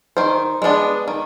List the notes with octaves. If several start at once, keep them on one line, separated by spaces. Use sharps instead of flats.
D#3 C5
G#3 B3 D4
D#3